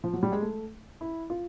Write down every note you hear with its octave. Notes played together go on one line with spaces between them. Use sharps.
F3
F#3
G3
G#3
A3
E4
F4